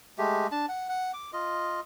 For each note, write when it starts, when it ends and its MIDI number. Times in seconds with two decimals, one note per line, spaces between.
0.18 0.47 56
0.18 0.47 57
0.18 0.47 67
0.52 0.66 62
0.52 0.66 81
0.68 0.88 78
0.89 1.12 78
1.14 1.31 86
1.33 1.80 65
1.33 1.80 75